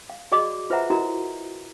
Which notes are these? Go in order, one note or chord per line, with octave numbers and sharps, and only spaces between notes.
F5
F#4 G#4 D5 D#5 D6
F4 B4 C5 E5 F#5 A#5
E4 F#4 A#4 D#5 A#5